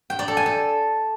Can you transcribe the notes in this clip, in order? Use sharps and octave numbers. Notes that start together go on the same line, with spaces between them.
G5
D5
A4
G#5
A4